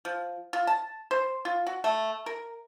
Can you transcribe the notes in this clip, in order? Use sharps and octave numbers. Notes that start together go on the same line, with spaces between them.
F3
F4
A5
C5
F4
F#4
A3
A#4